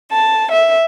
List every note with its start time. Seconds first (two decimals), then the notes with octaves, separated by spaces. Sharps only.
0.11 A5
0.51 E5